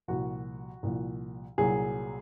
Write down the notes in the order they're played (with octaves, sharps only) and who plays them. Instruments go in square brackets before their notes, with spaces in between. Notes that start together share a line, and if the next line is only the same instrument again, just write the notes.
[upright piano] C2 A#2 F3 F#4
C2 A#2 F3
C2 A#2 F#3 G#4